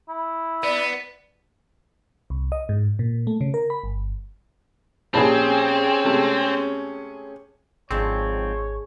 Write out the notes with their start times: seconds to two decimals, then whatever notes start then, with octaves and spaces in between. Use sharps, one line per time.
0.09 E4
0.64 B3 D5
2.30 C2
2.52 D#5
2.69 G#2
2.99 A#2
3.27 A3
3.41 C#3
3.54 A#4
3.70 B5
3.84 G1
5.14 A#1 C4 C#4 G4 G#4 A5 B5
6.04 C3 G#3 A3
7.91 G#1 F2 G#2 G#3 C4 D4 C#5